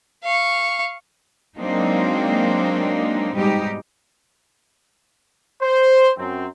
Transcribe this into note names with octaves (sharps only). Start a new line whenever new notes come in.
F5 C#6
F#3 G#3 A#3 C4 D4 D#4
G#2 B2 G3 D#4 G4
C5
F#2 C4